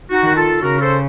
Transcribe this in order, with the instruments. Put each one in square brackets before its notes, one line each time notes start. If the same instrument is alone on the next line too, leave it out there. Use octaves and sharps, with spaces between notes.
[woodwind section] D#4 F#4
[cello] D#3
[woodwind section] F4 A4
[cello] C#3 [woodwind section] F#4 A#4
[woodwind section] A4 C5